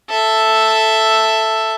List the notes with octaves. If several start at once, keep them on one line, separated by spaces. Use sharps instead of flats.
A4 E5